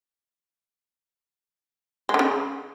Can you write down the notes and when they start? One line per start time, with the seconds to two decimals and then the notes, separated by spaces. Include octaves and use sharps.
2.09 G#3
2.14 D3
2.19 C#3